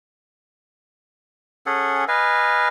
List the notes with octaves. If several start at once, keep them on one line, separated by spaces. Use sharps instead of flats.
C#4 G#4 A4 F#5
B4 D#5 F5 G#5